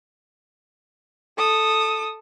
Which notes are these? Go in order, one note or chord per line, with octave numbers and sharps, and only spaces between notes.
A4 D#6